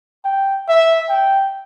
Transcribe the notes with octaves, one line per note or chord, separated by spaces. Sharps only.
G5
E5
G5